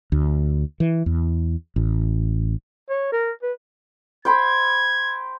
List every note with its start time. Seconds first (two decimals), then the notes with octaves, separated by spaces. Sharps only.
0.12 D2
0.80 E3
1.06 E2
1.76 A1
2.90 C#5
3.12 A#4
3.43 B4
4.25 C5 G5 B5 G#6